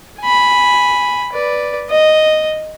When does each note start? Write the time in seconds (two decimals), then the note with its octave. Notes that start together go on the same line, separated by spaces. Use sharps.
0.20 G#5 B5
1.32 B4 D5
1.89 D#5